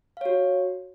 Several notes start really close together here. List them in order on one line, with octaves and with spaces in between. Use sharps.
F5 C#5 F#4